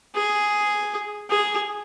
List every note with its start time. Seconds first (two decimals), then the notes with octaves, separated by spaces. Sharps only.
0.15 G#4
1.30 G#4